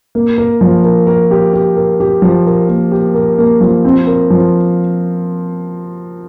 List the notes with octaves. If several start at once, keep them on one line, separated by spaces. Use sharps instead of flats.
A#3
A#4
F3
A#4
A#4
G4
G4
A#4
G4
F3
A#4
A#3
G4
A#4
A#3
F3
C4
A#4
F3